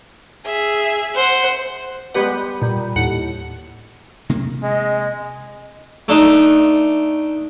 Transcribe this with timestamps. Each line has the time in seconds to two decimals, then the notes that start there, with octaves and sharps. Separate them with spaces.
0.45 G#4 E5
1.16 C5 F#5
2.14 G3 G#3 B3 G4 B4 F#5
2.62 A#2 G3
2.96 D#2 A2 F#5 C#7
4.29 C3 A#3 C4
4.63 G#3 D#5
6.08 A3 D4 D#4